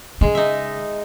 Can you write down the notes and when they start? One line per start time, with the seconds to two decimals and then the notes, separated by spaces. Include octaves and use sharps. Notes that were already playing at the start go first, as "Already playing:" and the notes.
0.21 C#3 G#3
0.35 D#4 E5